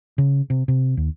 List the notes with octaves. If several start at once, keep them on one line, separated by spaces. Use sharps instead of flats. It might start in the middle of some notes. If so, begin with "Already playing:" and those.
C#3
C3
C3
D#2